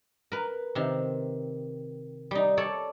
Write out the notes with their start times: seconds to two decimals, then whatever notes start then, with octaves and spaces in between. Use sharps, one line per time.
0.32 A#4 B4
0.75 C3 D#3
2.31 G3 D#4
2.57 A4 C#5 D5